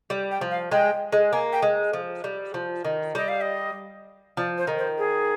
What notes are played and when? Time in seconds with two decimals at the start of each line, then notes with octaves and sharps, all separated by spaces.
0.10 G3
0.31 G5
0.41 F3
0.51 F5
0.72 G#3 G5
1.12 G#3
1.32 A#3 G#5
1.53 G5
1.62 G#3
1.93 F3
2.24 G3
2.54 F3
2.85 D#3
3.15 G3 D#5
3.28 F5
3.41 D#5
4.37 F3 D5
4.58 C5
4.67 D#3
4.78 C5
4.98 G#4